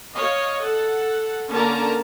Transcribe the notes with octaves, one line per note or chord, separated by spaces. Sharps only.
C#5 D#5 F5
A4 F#5
D3 A#3 C#4 A#4 A5 A#5